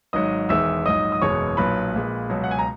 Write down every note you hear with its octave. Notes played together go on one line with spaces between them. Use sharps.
G#1 G#2 F#3 D#5 D#6
E1 E2 D#3 G#3 E5 E6
A#1 G#2 F#3 D#5 D#6
D#6
F#1 E2 B2 G#3 C#5 C#6
B1 A#2 F#3 B4 B5
A#1 A#2 G#3
C#2 B2 F#3
F#5
G#5
A#5